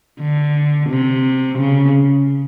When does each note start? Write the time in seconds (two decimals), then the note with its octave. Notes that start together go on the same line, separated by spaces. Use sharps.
0.21 D3
0.90 C3
1.58 C#3